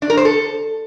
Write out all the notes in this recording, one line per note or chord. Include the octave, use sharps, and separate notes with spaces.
D4
A#4
C5
A4